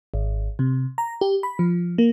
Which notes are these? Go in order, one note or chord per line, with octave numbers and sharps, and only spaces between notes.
G#1
C3
A#5
G4
B5
F3
A#3